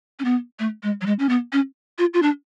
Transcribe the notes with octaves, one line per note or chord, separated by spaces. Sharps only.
C#4
B3
A3
G#3
F#3
G#3
C#4
B3
C#4
F4
F4
D4